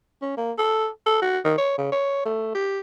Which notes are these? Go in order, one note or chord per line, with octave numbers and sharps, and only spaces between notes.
C#4
A#3
A4
A4
F#4
D#3
C#5
C#3
C#5
A3
G4